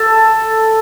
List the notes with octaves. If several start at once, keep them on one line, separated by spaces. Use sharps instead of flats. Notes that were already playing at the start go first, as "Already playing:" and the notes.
Already playing: A4